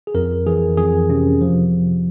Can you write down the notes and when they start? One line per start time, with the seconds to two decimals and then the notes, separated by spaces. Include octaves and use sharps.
0.07 G#4
0.15 F2 A#4
0.47 E3 G#4
0.77 F2 G#4
1.10 C3 C#4
1.41 F3